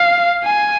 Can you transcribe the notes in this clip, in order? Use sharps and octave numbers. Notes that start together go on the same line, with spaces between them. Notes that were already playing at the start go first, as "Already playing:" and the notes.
Already playing: F5
G#5